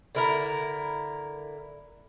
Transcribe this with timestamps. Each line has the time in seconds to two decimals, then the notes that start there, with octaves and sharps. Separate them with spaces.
0.15 D3 E4 A#4